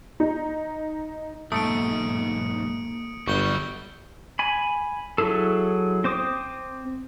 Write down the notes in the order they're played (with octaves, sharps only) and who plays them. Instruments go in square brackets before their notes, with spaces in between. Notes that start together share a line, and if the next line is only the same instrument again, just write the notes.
[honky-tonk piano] D#4
[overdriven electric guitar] B1 G#2 [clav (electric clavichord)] A3 [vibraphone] A#3 [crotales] D#6 C#7 D7
[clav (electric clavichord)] G1 [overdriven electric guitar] F#3 G3 [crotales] C#6 G6 G7
[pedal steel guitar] G#5 B5
F#3 E4 G#4 A4
C4 C5 D6 D#6